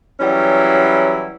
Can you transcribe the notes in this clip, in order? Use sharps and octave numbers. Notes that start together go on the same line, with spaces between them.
E3 F#3 G3 C#4 E4